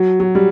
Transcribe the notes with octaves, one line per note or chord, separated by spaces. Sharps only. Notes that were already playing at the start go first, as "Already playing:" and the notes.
Already playing: F#3
F#3
G3